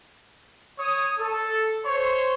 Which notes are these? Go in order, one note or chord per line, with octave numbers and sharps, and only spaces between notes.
C#5 D#6
A4
C5 C#5 C6